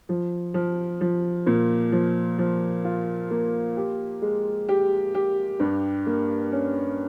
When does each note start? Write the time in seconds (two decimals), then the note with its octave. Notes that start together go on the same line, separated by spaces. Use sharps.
0.09 F3
0.54 F3
1.01 F3
1.46 A#2
1.92 F3
2.39 F3
2.85 F4
3.31 A#3
3.77 G4
4.22 G#3
4.69 G4
5.15 G4
5.60 G2
6.06 A#3
6.52 C#4